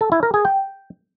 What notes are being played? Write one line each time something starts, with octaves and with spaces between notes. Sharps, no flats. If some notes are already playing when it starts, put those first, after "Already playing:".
A4
E4
A#4
G#4
G5